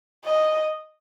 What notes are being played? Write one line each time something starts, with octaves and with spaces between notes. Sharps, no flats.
D#5